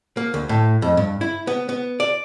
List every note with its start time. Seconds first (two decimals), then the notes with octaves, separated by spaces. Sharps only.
0.17 A#3
0.34 D2
0.49 A2
0.82 F2
0.97 G2
1.21 E4
1.47 B3
1.69 B3
2.00 D5